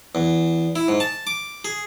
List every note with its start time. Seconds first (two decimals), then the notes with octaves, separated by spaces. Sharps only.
0.15 E2
0.76 E4
0.88 G#2
1.00 A5
1.27 D6
1.65 G#4